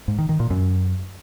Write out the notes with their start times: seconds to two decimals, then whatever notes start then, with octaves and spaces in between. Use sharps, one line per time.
0.08 G#2
0.18 D#3
0.29 D#3
0.40 A#2
0.50 F#2